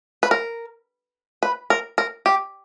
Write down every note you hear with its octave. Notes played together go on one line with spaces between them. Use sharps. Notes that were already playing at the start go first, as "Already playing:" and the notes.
B4
A#4
B4
A#4
A#4
G4